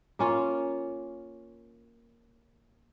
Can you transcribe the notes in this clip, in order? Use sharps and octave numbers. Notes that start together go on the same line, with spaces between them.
A#3 C#4 F4